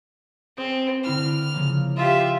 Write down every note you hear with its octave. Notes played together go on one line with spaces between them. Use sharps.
C4 G#4 C5
D3 E4 F6 C7
C#3 F3 A#3
F4 G4 D#5 E5 A5